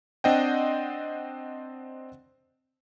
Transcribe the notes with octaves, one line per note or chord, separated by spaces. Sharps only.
C4 D4 C5 D#5 F#5 G5